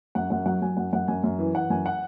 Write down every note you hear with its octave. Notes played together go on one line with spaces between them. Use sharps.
F#2 F#5
F#2 F#5
F#3 F#5
F#3 G#5
F#2 F#5
F#2 F#5
F#2 G#5
F#2
E3
E3 F#5
F#2 G#5
F#5